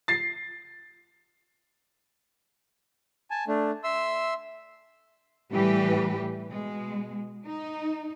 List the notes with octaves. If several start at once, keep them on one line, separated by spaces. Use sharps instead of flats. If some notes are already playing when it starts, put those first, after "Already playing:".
A6 C7
G#5 A5
A3 D4
E5 C6 E6
A2 E3 G3 G4 B4
B2 G#3
D#4